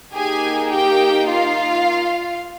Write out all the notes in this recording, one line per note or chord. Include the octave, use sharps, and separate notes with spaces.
A#3 D#4 G4 G#4 G#5
G4 G5
F4 F5